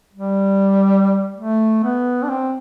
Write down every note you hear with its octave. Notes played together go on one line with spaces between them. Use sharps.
G3
A3
B3
D4
C4